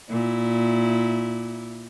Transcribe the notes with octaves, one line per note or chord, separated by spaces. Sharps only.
A#2 E4